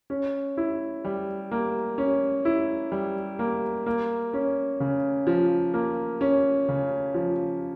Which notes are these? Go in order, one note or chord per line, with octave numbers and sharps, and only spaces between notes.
C#4
E4
G3
A#3
C#4
E4
G3
A#3
A#3
C#4
C#3
F3
A#3
C#4
C#3
F3